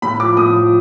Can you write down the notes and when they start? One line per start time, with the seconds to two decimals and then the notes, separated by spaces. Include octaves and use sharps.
0.02 A2 B5
0.19 F3 D6
0.37 A2 D#6
0.54 F3